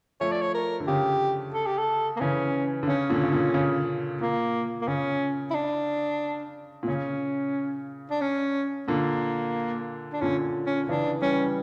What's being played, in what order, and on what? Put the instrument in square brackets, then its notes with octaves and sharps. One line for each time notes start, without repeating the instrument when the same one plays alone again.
[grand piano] F3 A3 [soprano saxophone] C#5
[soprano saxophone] D5
C#5
A#4
[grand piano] D3
[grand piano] C#3 [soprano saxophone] G4
[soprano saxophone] A4
G4
A4
A#3
[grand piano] C#3 E3 [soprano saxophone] C#4
[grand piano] D3
[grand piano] C#3 [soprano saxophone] C#4
[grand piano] A#2 D3
C#3
A#2 D3
C#3
[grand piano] A#2 [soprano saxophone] A#3
[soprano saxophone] A#3
[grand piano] C#3 [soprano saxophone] C#4
[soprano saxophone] E4
D4
[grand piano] A#2
[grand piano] C#3 [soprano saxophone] C#4
[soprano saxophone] D4
C#4
[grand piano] A#2 D3 [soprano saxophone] A#3
[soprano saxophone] D4
[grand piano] A#2 D3 [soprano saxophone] C#4
[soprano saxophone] C#4
[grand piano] C#3 E3 [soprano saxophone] D4
[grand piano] E3 G3 [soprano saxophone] C#4